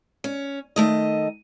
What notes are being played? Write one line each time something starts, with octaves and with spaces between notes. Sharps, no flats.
C#4
D#3 A3 D#5